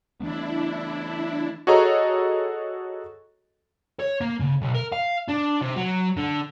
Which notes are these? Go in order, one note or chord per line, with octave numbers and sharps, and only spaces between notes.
E3 A3 B3 D4 E4
F#4 G#4 A4 C#5 D#5 A#5
C#5
A#3
C#3
B1
A#4
F5
D4
C3
F#3
D3